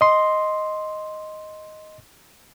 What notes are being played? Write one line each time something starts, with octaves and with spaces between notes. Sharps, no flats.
D#5 C6